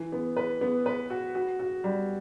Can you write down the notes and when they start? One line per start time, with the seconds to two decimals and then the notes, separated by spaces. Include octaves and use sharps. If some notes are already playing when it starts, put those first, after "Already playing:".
Already playing: E3
0.12 B3
0.37 B4
0.61 B3
0.86 B4
1.10 F#4
1.35 F#4
1.59 F#4
1.84 G3